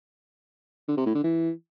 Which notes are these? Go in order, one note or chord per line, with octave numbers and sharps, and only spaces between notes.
D3
C3
A2
D3
E3